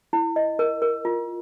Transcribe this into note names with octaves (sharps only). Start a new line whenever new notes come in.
E4
D#5
A#4
A#4
F4